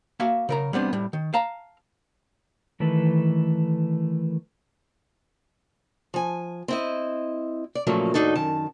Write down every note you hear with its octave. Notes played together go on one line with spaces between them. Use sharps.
A#3 F#4 E5 F5 A5
C#3 A#4 A#5
G3 B3 C4 D4
A2 G3
D#3
F5 A5 A#5
D#3 E3 A3 A4 B4
F3 G#5
C4 E4 D#5
D5
A#2 C#3 F3 F#3 A3 A#3
D#2 A2 D4 D#4 F#4 A4
F#2 D#3 A5